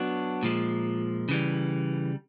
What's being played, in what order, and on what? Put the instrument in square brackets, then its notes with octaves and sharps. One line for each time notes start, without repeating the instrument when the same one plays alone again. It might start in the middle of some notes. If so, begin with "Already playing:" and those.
Already playing: [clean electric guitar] F#3 B3 D4 F#4
A#2 F3 G#3
C#3 E3 G3